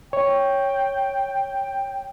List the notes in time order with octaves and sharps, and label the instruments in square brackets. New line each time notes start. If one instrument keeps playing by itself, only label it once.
[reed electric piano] C#5 [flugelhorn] G5